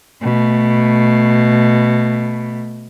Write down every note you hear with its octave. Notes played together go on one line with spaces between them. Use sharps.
B2 A3